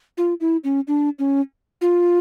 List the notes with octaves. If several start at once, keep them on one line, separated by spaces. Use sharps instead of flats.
F4
E4
C#4
D4
C#4
F4